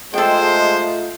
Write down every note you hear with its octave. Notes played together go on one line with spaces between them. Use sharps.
G#3 A3 D#4 F4 A4 C5 G5